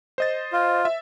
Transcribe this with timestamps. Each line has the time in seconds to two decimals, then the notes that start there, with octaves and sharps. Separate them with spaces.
0.18 C5 D#5 A6
0.53 F4
0.85 E5